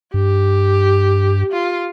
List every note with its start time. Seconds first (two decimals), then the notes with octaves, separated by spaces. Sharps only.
0.14 G2 G4
1.52 F4